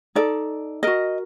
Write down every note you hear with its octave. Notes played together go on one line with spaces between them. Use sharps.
D#4 A4 D5
F#4 A#4 D#5